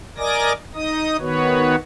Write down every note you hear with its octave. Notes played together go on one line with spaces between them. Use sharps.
A#4 D5 D#5 G#5 D6 A#6
D#4 D#5 D#6
D#3 B3 F#4 B4 C#5